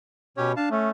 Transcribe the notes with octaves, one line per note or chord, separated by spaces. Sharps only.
B2 C#4 G4 C#5
D4 F5 A5
A3 C#4